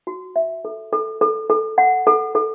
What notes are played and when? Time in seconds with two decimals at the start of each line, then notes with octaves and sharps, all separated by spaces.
0.07 F#4
0.36 E5
0.65 A4
0.93 A4
1.21 A4
1.50 A4
1.78 F#5
2.07 A4
2.35 A4